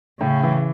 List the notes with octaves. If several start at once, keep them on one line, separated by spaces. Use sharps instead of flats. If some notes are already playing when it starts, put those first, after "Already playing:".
A2 C#3
E3